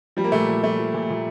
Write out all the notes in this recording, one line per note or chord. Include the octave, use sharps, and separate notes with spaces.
F3 G3
A#3
A#2 A3
A#2
F3 A3
F3
A#2
A#2